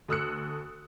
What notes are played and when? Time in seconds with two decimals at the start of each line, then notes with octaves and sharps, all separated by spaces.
0.08 D2 A4 D#6 E6 F#6 C#7